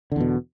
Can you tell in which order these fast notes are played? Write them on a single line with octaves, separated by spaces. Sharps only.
D3 E2 B2